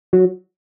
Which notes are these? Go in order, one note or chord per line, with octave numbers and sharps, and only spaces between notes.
F#3